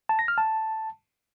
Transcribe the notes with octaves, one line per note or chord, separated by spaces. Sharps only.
A5
A#6
F6
A5